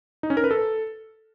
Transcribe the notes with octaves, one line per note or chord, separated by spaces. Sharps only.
D#4
C#4
A#4
B4
A4